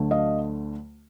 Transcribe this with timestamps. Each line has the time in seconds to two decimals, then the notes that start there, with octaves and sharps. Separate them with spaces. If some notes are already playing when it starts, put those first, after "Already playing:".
Already playing: D2 D3 F#3 A3
0.11 D#5 F5